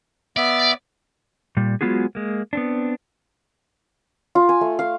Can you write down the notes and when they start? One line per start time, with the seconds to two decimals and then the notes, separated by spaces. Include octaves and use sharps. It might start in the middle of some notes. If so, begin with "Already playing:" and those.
0.37 B3 D5 E5
1.57 A#2 G3
1.81 F#3 G#3 B3 F4 F#4 G#4
2.15 G#3 A#3
2.53 B3 C4 D4
4.35 F4
4.49 G#5
4.61 A3
4.79 F5